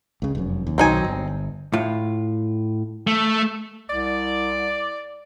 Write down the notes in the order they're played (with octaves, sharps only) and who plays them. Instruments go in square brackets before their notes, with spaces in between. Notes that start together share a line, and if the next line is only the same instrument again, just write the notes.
[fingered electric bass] C#2 C#3
F1 F#2
D#2
[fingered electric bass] B1 D#3 F#3 [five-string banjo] C4 D#4 G#5
[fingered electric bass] G1
[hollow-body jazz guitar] A2 F4
[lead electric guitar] A3
[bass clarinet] C2 [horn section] D5